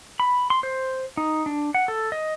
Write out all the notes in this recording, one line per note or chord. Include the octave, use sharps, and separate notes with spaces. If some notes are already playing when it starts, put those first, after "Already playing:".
B5
C6
C5
D#4
D4
F#5
A4
D#5